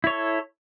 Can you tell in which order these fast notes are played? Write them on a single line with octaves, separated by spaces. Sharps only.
E4 C#5 A4